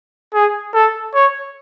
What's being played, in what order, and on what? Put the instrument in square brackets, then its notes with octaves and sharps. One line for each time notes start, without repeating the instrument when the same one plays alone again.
[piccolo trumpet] G#4
A4
C#5